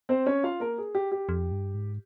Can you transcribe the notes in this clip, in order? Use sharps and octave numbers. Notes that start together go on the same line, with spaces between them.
C4 C5
C#4 C#5
F4 F5
A#3 A#4
G#4
G4
G4
F2
G2
G#2